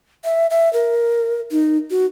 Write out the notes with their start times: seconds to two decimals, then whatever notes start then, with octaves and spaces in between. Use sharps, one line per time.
0.24 E5
0.50 E5
0.73 A#4
1.51 D#4
1.91 F#4